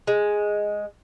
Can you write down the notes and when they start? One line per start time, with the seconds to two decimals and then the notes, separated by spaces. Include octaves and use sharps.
0.07 G#3